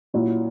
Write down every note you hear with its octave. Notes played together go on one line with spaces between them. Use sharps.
A#2 F#3 C#4 E4